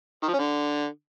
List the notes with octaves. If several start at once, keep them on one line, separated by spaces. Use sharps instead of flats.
D#3
F3
C#4
D3